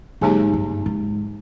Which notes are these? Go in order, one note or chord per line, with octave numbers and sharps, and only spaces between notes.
G#2 D3 F#3 A#3 D#4 G4
G2
G#2